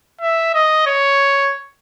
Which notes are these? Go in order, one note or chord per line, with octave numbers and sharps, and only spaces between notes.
E5
D#5
C#5